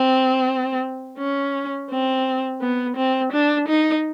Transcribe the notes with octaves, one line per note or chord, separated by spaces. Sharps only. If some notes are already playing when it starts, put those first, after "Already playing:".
Already playing: C4
C#4
C4
B3
C4
D4
D#4